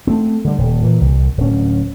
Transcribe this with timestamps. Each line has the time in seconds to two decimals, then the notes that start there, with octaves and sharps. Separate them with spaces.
0.07 A3 C4
0.45 D3 G3
0.58 D#1
0.82 A#2 E3
1.01 C2
1.37 D1 C#4